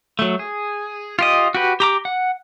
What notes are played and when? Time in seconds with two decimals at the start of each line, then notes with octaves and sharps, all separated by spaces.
0.19 F#3 A3
0.39 G#4
1.19 F4 G4 D#5
1.54 F#4 G4 B4
1.80 G4 A#5 D6
2.05 F#5